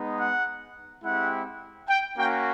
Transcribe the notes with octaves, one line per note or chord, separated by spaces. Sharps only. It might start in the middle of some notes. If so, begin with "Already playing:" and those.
Already playing: G#3 B3 D#4
F#5
G#3 C4 E4 G4 F#5
G5
A#3 C#4 F#4 G5